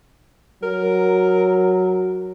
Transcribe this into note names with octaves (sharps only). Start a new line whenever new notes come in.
F#3 A#4